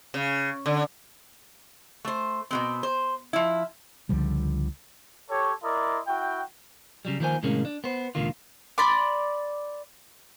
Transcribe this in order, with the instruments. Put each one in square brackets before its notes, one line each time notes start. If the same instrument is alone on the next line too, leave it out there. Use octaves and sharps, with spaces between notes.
[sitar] C#3
D3
[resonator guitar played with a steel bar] A3 C5
B2 G#3 C4
C5
F3 E4
[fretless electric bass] C#2 D3 F3 G3
[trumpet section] G4 A4 C#5
E4 A#4 D5 D#5 C6
E4 F#4 G5
[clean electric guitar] C#3 F#3 G3
D#3 F3 A#3 B3 C5 G#5
A2 C3 D#3 G#3 A#3 C#4
D4
B3 C5
C#2 A#2 D3 D#3 F4
[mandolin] D5 B5 C6 D6